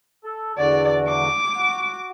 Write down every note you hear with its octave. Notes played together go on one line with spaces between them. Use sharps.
A4
E2 D3 F#4 D5
D6
F#4